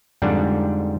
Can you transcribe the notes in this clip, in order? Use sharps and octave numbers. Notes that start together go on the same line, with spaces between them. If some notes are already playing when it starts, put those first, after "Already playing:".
F2 G#2 D3 G3 D4 F#5